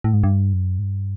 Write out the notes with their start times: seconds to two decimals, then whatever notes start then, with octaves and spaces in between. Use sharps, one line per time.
0.04 A2
0.14 G#2
0.24 G2
0.53 F#2
0.79 G#2
0.83 G2